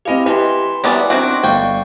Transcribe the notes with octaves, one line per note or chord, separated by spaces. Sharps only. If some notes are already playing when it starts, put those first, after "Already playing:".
C4 E4 G4 D#5 F5
E3 G4 B4 A5 C6
C3 E3 F#3 G3 B3 D5 E5
D#3 C4 D4 F#4 D6 D7
G1 D5 F5 G5 C#6